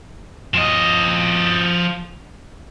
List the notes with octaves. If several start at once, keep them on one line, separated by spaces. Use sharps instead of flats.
F3 D#5